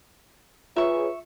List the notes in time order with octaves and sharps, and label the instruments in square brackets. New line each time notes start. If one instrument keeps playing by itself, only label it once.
[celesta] F4 [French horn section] G#4 B4 C#5 [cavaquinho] E5 C#6